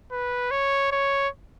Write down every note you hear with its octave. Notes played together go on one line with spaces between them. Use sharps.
B4
C#5
C#5